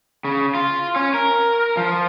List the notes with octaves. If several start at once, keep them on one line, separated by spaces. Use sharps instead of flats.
C#3
F4
C#4
A#4
F3